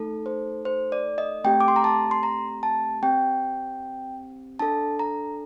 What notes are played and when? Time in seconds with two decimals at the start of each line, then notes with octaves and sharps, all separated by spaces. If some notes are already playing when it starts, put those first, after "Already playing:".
Already playing: A3 D#4 A4
0.26 C5
0.65 C5
0.92 D5
1.18 D#5
1.44 A3 C4 G4 G5
1.60 D6
1.68 C6
1.76 A#5
1.84 A5
2.11 C6
2.23 A#5
2.63 A5
3.03 C4 G4 G5
4.59 D4 A4 A5
4.99 A#5